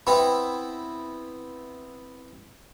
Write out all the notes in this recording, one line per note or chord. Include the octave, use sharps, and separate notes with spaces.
B3 C4 E4 G5 B5